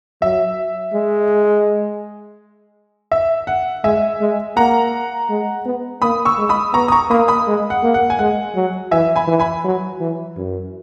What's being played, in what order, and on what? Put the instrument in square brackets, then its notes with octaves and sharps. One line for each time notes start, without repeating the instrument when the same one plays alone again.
[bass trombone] F#3 [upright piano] E5
[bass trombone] G#3
[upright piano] E5
F#5
[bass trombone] G#3 [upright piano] E5 G#5
[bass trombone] G#3
[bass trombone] A#3 [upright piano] F#5 A#5
[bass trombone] G#3
B3
[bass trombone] A#3 [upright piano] B5 D#6
[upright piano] C#6 E6
[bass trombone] G#3
[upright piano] B5 D#6
[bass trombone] B3 [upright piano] A#5 C#6
[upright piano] D#6
A#5 C#6
[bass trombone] A#3 [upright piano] B5 D#6
[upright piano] B5 D#6
[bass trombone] G#3
[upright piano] F#5
[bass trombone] A#3
[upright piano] F#5
G#5
[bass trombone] G#3 [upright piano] F#5
[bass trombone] F#3
[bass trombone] E3 [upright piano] E5 G#5
[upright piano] G#5 B5
[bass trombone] E3
[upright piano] G#5 B5
[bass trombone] F#3
E3
F#2